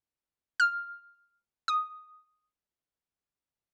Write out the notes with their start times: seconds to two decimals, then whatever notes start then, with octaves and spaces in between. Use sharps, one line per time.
0.60 F6
1.68 D#6